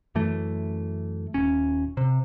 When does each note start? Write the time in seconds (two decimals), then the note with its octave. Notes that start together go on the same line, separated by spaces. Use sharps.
0.15 F#2 E3 A3
1.34 D#1 C#4
1.97 C3